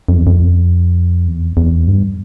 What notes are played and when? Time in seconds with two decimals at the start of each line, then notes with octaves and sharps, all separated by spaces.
0.09 F2
0.18 E2
0.27 F2
1.27 E2
1.57 E2
1.87 G2